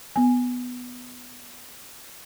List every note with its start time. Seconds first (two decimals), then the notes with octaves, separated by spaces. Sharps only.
0.16 B3 G#5